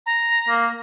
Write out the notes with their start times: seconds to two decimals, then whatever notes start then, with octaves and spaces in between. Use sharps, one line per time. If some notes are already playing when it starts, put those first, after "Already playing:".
0.06 A#5
0.49 A#3